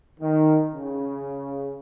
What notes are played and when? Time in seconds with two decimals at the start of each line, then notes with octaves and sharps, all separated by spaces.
0.20 D#3
0.73 C#3